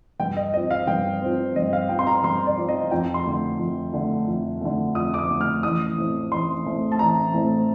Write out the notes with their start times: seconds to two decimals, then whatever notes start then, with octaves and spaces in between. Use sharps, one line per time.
0.20 G2 G5
0.37 D#5
0.54 F3 C4 D#5
0.71 F5
0.87 G2 G5
1.21 F3 C4
1.56 G2 D#5
1.73 F5
1.89 F3 C4 G5
1.99 C6
2.07 A#5
2.24 G2 C6
2.46 D5
2.58 F3 C4
2.69 D#5
2.91 F2 G5
3.14 C6
3.26 D3 A3
3.59 F2
3.93 D3 A3
4.27 F2
4.61 D3 A3
4.95 F2 D#6
5.14 D6
5.18 D#6
5.29 D3 A3
5.41 F6
5.63 A1 D#6
5.98 A2 A3 C4
6.31 A1 C6
6.65 A2 A3 C4
6.92 A5
6.99 A1 A#5
7.33 A2 A3 C4